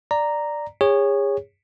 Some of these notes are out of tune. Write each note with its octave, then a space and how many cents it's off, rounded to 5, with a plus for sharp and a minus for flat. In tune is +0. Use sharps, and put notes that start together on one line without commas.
D5 +5 A#5 -5
G#4 -35 C#5 +0